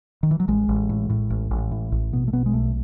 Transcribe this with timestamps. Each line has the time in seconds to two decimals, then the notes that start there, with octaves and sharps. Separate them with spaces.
0.23 D#3
0.31 E3
0.40 F#3
0.48 A1 G#3
0.69 A1
0.89 A2
1.10 A2
1.30 A1
1.51 A1
1.71 A2
1.92 A1
2.13 B2 B3
2.28 A3
2.33 B2 B3
2.46 G#3
2.53 B1 A3